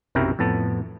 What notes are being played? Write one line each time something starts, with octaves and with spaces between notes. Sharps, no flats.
B1 F#2 C3 E4 A#4 G5
F2 A2 B3 A5